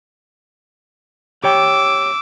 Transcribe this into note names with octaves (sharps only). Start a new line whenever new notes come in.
G4 C#5 G5 D6 E6